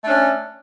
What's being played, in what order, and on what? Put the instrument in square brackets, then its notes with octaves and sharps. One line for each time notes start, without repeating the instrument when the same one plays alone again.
[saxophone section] A3
D4
C#4